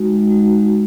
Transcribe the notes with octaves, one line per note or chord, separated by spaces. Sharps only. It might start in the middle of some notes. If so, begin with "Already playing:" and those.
Already playing: G#3 D#4 F#4
G#3 D#4 F#4